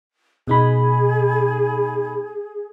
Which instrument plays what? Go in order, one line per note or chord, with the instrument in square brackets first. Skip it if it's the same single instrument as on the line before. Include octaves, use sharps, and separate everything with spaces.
[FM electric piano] B2 D#4 B5 [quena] G#4